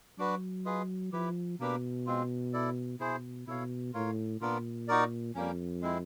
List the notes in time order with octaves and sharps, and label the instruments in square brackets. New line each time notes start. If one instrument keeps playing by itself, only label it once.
[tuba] F#3 [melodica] D4 F#4 B4
[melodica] F4 G#4 B4 D#5
[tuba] F3 [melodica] E4 G4 B4
[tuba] B2 [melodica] A#3 D4 G4 B4
[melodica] G#3 C4 F4
E4 A4 D5
[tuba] B2 [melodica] E4 G#4 C5
[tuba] B2 [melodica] E4 A4 C#5 F5
[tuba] A2 [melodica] F4 A#4 C#5 F5
[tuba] A#2 [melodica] B3 D4 F4 A#4
[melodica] D#4 F#4 A#4 D5
[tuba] F2 [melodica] G3 A#3 C#4
[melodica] G#3 C4 E4